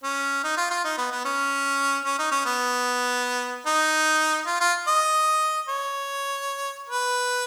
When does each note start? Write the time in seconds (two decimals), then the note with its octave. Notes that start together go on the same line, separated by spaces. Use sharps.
0.04 C#4
0.44 D#4
0.58 F4
0.71 F4
0.85 D#4
0.98 B3
1.12 B3
1.25 C#4
2.05 C#4
2.19 D#4
2.32 C#4
2.46 B3
3.66 D#4
4.47 F4
4.61 F4
4.87 D#5
5.68 C#5
6.89 B4